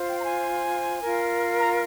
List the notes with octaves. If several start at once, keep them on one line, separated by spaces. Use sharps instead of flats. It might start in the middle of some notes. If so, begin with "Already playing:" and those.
Already playing: F4 C5
G5
A#5
G#5
F4 A#4
A#5